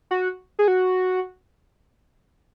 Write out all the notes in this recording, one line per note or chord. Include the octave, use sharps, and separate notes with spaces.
F#4
G#4
F#4